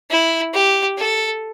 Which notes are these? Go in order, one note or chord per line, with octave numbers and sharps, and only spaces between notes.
E4
G4
A4